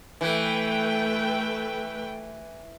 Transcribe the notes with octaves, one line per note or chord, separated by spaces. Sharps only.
E3 A3 B4 G5